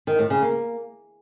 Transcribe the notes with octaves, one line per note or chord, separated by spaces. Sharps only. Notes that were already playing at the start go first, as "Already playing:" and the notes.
D#3
A2
C#3
A#3